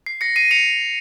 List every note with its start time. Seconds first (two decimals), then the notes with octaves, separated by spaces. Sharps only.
0.06 C7
0.21 A#6 C#7
0.36 C7 D#7
0.51 C#7 F7